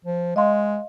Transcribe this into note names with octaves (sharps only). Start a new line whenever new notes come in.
F3
G#3 D#5 F5 C6